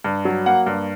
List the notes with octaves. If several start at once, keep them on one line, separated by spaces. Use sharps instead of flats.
G2
F#3
A#3 F#5
G2